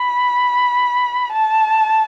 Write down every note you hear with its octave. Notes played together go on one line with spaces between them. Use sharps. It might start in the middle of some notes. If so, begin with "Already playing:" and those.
Already playing: B5
A5